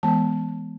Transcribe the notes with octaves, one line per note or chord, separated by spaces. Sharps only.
E3 G#3 B3 A5